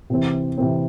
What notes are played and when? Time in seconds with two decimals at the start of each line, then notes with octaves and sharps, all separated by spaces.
0.10 C3 E3 C4
0.58 C3 E3 C4